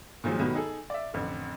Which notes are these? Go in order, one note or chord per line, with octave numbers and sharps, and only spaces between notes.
A#2 D#3 F3 F#3 G#3
B2 D#3 F#3 G3 A3 B3
D#4 G#4 A4
D5 E5
A1 F2 D3